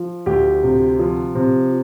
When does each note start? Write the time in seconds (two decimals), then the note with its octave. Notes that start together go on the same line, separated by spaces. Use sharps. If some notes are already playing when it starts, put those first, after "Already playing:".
Already playing: F3
0.26 D2 G4
0.63 C3
0.99 F3
1.35 C3